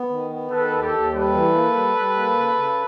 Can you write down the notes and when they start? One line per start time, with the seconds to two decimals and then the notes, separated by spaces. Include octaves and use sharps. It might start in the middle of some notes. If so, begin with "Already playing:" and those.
Already playing: B3
0.10 D#3
0.30 B3
0.51 D#3 A4 B4
0.72 D#2
0.82 G4 A4
0.92 D#2
1.12 G3 A4 B4
1.33 E3
1.54 A#3
1.74 G3
1.94 G3
2.15 A#3
2.36 C#3
2.56 C#3